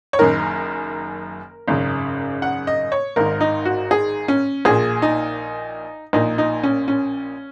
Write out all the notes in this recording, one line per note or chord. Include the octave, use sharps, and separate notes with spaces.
C#5
F#1 F#2 D#3 A#4
G#1 F#2 C#3
F#5
D#5
C#5
G#1 G#2 D#3 A#4
D#4
F#4
G#4
C#4
A#1 A#2 G#4
D#4
A#1 A#2 D#4
D#4
C#4
C#4